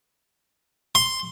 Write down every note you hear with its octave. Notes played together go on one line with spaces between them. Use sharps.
C6